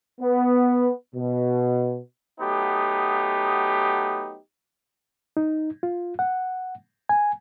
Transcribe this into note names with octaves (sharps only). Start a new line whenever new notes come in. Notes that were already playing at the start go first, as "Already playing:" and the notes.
B3
B2
F#3 A3 B3 D#4 G4
D#4
F4
F#5
G#5